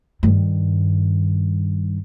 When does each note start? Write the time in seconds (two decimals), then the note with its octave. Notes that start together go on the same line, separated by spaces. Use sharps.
0.23 G2 D#3